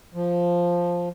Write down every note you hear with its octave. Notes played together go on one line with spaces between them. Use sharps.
F3